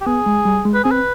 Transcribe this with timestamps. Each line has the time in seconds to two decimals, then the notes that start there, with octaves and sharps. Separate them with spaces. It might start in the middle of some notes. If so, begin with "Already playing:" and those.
0.01 G4
0.06 B3 G#4
0.26 G#3
0.45 G3
0.65 G#3
0.74 B4
0.84 C4 G#4
0.91 B4